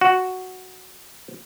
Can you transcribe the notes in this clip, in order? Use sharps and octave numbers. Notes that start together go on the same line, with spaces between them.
F#4